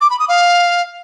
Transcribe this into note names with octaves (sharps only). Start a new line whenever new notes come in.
D6
B5
D#6
F5